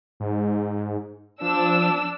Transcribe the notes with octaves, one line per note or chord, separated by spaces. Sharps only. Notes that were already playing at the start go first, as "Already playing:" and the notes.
G#2
F3 D4 E6